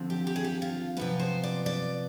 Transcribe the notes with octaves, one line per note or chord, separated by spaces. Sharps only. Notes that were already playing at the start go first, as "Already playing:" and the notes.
Already playing: D#2 D3 F3 C4
G4
G4
G#4
G4
F4
C3 F3 B3 B4
C5
D5
D5